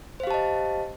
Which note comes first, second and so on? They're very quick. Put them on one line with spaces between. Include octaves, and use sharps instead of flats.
C5 F5 G4 A5 D#5